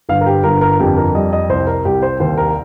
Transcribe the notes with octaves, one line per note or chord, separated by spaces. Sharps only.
G1 F5
A#4
G4
G1 A#4
A#4
F2 G4
A#4
G3 D#5
D#5
C2 C5
A#4
C2 G4
C5
D#2 C5
A#4